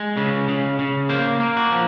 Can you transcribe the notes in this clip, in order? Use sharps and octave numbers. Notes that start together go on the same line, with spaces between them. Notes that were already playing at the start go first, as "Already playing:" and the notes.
Already playing: G#3
C#3
C#3
C#3
A#3 C5
A#3
F#4
F3